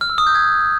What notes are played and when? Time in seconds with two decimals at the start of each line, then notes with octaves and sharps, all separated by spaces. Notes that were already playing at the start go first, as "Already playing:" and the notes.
0.01 F6
0.10 E6
0.18 D#6
0.27 G6
0.35 G#6